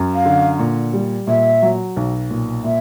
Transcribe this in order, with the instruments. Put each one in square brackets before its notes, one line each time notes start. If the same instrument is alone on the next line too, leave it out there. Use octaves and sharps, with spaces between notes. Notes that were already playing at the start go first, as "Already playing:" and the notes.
Already playing: [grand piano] F#2
[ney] F5
[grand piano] D3
A#2
G3
[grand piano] A#2 [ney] E5
[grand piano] F#3
B1
A#2
[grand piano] A#2 [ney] E5